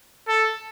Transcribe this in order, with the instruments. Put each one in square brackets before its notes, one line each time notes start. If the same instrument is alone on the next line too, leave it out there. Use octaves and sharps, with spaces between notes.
[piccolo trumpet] A4